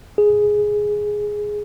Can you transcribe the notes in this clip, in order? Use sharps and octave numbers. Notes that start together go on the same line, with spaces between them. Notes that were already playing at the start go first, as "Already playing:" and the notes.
G#4